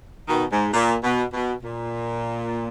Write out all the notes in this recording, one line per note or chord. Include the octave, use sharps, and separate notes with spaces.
B2 D#3
G#2
A#2
B2
B2
A#2